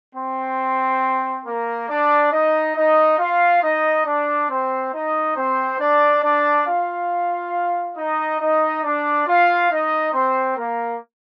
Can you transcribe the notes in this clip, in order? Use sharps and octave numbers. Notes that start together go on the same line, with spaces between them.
C4 C5
A#3 A#4
D4 D5
D#4 D#5
D#4 D#5
F4 F5
D#4 D#5
D4 D5
C4 C5
D#4 D#5
C4 C5
D4 D5
D4 D5
F4 F5
D#4 D#5
D#4 D#5
D4 D5
F4 F5
D#4 D#5
C4 C5
A#3 A#4